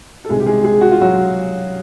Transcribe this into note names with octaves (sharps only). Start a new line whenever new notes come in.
A4
C2 C3 D#3 G#3 G#4
G4
G#3 G#4
G#3 G#4
F#4
F4
F#3 F#4